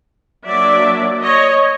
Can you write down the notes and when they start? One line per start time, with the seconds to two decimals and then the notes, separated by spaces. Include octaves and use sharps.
0.47 F#3 A#3 D4 D5 E5
1.23 C#5 D#5